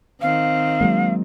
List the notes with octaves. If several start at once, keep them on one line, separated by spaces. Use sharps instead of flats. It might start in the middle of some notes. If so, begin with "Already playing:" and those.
D#3 C4 F5
F#3 G#3 A#3